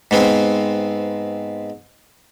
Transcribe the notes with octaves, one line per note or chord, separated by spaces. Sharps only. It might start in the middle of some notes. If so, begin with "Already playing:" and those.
G#2 B3 C4